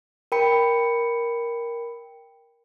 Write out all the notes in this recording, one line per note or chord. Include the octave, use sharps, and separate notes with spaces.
A#4 G5 B5 C#7